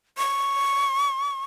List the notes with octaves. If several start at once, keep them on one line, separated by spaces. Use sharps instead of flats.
C#6